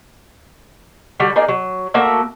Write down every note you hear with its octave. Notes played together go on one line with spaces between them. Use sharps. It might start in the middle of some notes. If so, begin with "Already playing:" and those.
D3 G3 F#4
A#3 D#4 G#4 D5
F#3
A3 A#3 F#4 E5